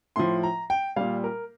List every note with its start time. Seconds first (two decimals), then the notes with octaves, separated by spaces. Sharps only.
0.16 A2 F3 C6
0.43 A#5
0.70 G5
0.96 A#2 G3 F5
1.24 A#4